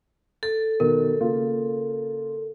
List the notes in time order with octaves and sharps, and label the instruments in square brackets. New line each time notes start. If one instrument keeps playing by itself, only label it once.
[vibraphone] A4 [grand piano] A6
[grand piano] B2 D#3 [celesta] A#4
[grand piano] C#3 A#3 F4